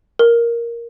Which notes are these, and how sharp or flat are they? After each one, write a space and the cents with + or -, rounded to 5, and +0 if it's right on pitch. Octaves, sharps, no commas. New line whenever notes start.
A#4 +5